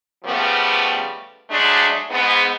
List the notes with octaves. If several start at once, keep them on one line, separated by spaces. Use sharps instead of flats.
C#3 F3 G3 A3 B3
F#3 G#3 A3 D4
G#2 B3